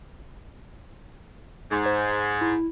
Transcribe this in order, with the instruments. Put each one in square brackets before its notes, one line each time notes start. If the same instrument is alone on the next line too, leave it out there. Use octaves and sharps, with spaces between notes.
[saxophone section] G#2
[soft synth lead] C5
E4